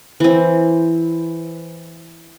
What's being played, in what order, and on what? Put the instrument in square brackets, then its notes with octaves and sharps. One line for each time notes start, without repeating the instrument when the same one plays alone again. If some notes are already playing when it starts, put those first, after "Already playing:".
[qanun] E3 C4